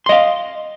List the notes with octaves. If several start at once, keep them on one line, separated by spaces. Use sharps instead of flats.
D#5 F5 C6